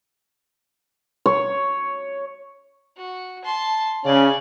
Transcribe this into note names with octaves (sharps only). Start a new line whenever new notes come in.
C#5
F#4
A5 C6
C#3 C#4 D5 G#5